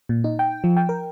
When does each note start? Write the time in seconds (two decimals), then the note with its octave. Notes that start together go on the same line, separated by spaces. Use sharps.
0.09 A#2
0.24 D#4
0.39 G5
0.64 F3
0.77 G5
0.89 A#4